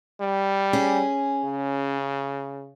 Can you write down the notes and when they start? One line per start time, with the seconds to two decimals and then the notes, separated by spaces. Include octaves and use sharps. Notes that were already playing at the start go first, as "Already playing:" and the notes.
0.20 G3
0.73 C#4 G#4
1.44 C#3